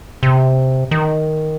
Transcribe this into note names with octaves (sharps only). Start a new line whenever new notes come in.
C3
D#3